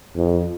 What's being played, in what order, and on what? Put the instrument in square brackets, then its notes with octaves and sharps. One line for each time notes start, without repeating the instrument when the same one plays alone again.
[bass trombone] F2